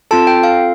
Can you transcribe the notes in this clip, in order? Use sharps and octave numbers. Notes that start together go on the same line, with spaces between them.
C4 F4 A4 A5
G5
F5